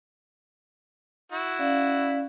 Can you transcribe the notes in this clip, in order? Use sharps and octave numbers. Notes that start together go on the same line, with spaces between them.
E4 F#4
C#4 D5 F5